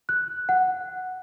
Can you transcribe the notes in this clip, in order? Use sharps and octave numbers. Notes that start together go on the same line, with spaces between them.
F#6
F#5